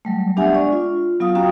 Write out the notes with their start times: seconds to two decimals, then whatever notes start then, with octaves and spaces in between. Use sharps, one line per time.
0.05 F#3 G3 A3
0.37 B3 D4 G4 E5 F#5 G#5
0.53 G#3 D4 D5 C#6
0.72 F4
1.20 F#3 B3 F4 F5 D#6
1.35 C#4 F#4 F5 G5 A#5 D#6